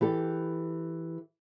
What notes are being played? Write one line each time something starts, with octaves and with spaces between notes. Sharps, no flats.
E3 G4 A4